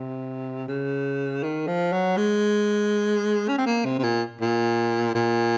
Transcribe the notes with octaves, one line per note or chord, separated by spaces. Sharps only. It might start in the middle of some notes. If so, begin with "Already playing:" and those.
Already playing: C3
C#3
D#3
F3
F#3
G#3
C#4
C4
A#3
C3
C3
A#2
A#2
A#2